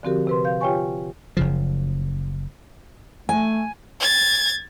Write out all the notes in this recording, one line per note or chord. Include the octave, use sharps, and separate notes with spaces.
D3 F3 C4 F#4 G4 A#4
C3 B4 C6
F5 G6
F4 G4 C#5 G5 G#5 C#6
F#1 C#3 F3
A3 G#5
G#6 A6